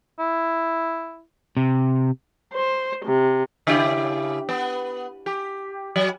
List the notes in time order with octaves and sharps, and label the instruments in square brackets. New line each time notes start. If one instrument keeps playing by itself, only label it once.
[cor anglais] E4
[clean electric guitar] C3
[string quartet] C5
C3
[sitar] C#3 E4 G4
B3
G4
F#3